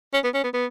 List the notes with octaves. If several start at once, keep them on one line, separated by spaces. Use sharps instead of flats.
C#4
B3
C#4
B3
B3